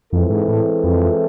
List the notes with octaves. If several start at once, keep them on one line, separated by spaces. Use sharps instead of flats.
F2 E3 G#3 C4 E4 A4
G#2
A2
F2